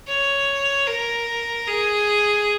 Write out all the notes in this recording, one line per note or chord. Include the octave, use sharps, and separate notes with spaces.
C#5
A#4
G#4